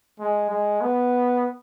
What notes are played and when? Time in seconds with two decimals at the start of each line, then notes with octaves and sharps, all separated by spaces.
0.19 G#3
0.50 G#3
0.81 B3